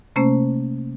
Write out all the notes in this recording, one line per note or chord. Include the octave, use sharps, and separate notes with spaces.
C3 A3 A#3 C#4 C5